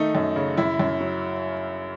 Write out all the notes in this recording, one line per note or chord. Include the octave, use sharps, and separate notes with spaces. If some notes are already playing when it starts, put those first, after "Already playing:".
Already playing: D#3 A3 D#4
F#2
C#3
F#2 E4
F#2
F#3